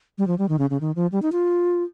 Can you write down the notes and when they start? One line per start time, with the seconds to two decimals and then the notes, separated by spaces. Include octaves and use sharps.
0.18 G3
0.27 F3
0.39 G3
0.49 D#3
0.59 C#3
0.70 C#3
0.81 D#3
0.96 F3
1.12 G3
1.22 D#4
1.32 F4